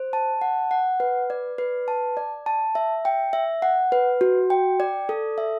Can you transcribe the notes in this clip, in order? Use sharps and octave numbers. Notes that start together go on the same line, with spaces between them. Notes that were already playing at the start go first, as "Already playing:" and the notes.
Already playing: C5
A5
F#5
F#5
B4
D5
B4
A5
D5
A5
E5
G5
E5
F#5
B4
F#4
G5
D5
A4
E5